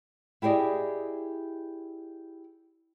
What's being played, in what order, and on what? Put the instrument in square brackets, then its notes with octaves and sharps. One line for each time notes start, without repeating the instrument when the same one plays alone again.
[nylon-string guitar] E4 G4 G#4 D5 D#5